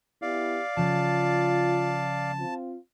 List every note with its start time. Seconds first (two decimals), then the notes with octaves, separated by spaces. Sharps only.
0.22 B3 E4 G4 D5 F5
0.77 C#3 F3 F4 A5
2.40 C4 F4